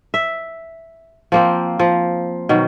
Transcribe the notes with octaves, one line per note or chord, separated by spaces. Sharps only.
E5
F3 A#3 C4
F3
B2 D#3 F#3